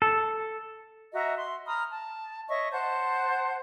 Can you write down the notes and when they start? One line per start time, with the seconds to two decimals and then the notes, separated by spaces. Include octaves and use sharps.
0.02 A4
1.13 F#4 D#5 E5 A#5
1.37 C6
1.66 A#5 B5 D#6 F6
1.90 A5
2.48 C#5 D#5 E5 C#6
2.72 C5 F#5 A5 G6